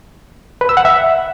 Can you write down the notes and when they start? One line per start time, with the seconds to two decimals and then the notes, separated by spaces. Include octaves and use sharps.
0.61 B4
0.69 E6
0.77 F#5
0.85 E5